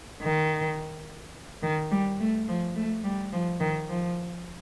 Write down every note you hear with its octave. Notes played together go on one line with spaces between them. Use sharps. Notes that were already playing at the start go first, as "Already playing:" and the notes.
D#3
D#3
G3
A3
F3
A3
G3
F3
D#3
F3